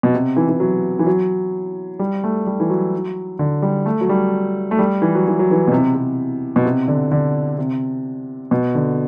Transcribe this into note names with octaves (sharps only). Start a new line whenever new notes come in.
B2
C3
E3
E3
F#3
E3
F#3
G3
A3
G3
E3
F#3
D3
G3
A3
F#3
G3
A3
G3
E3
F#3
E3
F#3
E3
B2
C3
C3
B2
C3
D3
D3
C3
B2
D3